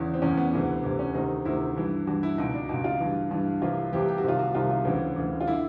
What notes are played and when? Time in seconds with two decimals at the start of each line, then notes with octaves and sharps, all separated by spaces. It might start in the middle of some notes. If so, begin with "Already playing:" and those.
Already playing: E2 C#3 E3 C#4
0.14 C4
0.22 E2 C#3 E3 C#4
0.37 B3
0.53 D2 C3 E3
0.84 D2 C3 E3
0.99 C#4
1.14 D2 C3 D#3 D#4
1.45 D2 C3 D#3 E4
1.77 G2 E3
2.07 G2 E3 F#4
2.23 E4
2.38 C#2 B2 D#4
2.54 D4
2.69 C#2 B2 D#4
2.84 F4
3.00 G2 E3
3.31 G2 E3
3.62 C2 C3 E3 F4
3.93 C2 C3 E3 G4
4.09 G4
4.18 F#4
4.24 C2 C3 D#3 F4
4.39 F#4
4.55 C2 C3 D#3 F4
4.70 F4
4.85 D2 C#3 E3
5.16 D2 C#3 E3
5.41 F4
5.47 D3 E4